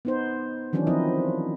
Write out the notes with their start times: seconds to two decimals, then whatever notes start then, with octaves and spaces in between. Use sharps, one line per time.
0.05 B3 D#4 C5
0.73 D#3 E3 F#3 C#4 D4
0.87 F3 C4 D#4 E4 D#5